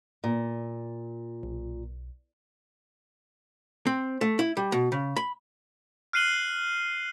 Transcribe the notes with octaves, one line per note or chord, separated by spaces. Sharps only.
A#2
B1
C4
A3
E4
G3
B2
C#3
B5
F6 F#6 C7 D#7 F#7 G7